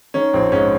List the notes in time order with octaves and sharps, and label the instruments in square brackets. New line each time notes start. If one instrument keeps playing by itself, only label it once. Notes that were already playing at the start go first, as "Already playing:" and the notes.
[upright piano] D#3 C#4
A#1 C4
G#2 C#4